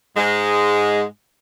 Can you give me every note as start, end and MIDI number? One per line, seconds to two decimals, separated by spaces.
0.16 1.03 44
0.16 1.03 56